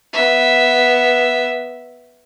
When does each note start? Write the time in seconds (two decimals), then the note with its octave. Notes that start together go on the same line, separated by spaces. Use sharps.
0.13 B3 E5